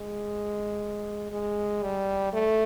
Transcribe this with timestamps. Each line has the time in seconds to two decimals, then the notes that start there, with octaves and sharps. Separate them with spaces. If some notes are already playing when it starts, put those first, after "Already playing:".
Already playing: G#3
1.32 G#3
1.83 G3
2.33 A3